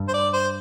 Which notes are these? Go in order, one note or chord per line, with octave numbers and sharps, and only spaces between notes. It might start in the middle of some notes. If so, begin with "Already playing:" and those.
Already playing: G2
C5
D5
C5